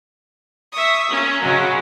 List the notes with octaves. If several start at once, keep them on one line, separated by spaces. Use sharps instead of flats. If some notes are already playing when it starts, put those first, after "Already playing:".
E5 C#6 D#6
A#3 C#4
C#3 F#3 G#3